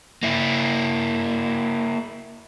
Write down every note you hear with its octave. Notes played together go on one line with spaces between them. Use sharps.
A#3 E4